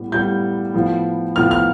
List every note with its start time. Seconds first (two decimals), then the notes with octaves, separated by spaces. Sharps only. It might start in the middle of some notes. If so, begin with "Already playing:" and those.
Already playing: A2 G3 B3
0.12 A2 G3 B3 G6
0.74 A2 F3 B3
1.36 A2 F3 B3 F6
1.51 F6